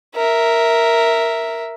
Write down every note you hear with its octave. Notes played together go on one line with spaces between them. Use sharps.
A#4 E5